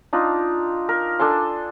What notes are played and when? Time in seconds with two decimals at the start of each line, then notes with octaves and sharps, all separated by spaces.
0.13 D4 D#4 F4
0.89 A#4
1.19 D4 A4 G#5 C6